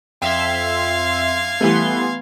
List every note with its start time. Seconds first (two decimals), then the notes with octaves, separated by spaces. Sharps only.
0.22 F2 E5 F5 G5 C6 G#6
1.61 E3 G3 A3 B3 C6